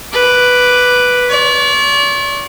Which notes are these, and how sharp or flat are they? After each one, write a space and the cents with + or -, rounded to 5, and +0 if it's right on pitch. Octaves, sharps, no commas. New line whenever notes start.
B4 +0 D6 +0
D5 -40 C#6 -40